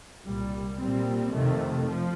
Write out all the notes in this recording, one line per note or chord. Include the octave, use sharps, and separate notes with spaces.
C2 A#2 G3
A#2 G3 C4
F2 C3 D#3 A3
F3